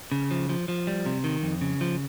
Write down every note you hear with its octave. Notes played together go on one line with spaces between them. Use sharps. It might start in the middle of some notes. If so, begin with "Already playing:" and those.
C#3
F3
F3
F3
G3
C3
D#3
F2
C#3
F3